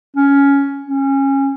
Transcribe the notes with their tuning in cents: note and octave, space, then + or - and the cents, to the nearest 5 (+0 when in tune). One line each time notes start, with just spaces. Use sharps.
C#4 +10
C#4 -20